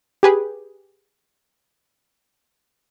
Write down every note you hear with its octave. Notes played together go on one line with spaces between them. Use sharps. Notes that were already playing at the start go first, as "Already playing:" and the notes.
G4 G#4 B4